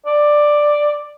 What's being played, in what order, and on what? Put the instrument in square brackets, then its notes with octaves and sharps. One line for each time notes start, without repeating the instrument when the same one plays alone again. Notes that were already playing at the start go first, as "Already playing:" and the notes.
[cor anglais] D5